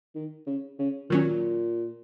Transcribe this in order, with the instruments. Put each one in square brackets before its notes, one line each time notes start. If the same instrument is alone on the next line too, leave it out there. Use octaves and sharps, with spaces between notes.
[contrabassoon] D#3
C#3
C#3
[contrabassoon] A#2 [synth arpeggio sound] D#3 F#3 C#4